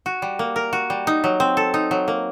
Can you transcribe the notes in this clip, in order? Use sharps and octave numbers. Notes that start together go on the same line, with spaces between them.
F#4
G3
A#3
A#4
F#4
G3
D#4
F#3
C4
A4
D#4
F#3
A#3